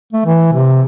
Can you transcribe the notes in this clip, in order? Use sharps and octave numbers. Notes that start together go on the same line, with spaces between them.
A3
E3
C3